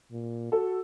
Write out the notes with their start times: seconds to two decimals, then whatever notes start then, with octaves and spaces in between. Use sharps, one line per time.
0.12 A#2
0.52 F#4 A4